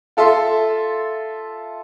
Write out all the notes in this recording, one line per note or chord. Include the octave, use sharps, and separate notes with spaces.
F4 A4 E5 C6